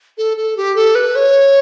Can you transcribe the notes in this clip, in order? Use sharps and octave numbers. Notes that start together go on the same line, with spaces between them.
A4
A4
G4
A4
B4
C#5